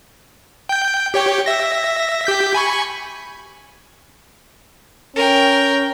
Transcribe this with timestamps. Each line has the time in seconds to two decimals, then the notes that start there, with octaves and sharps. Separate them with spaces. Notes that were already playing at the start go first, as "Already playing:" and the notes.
0.69 G5 G6
1.14 G4 C#5 G5
1.46 E5 A#6
2.25 G4 G6 B6
2.54 G#5 B5 C#6
5.16 C#4 A#4 G5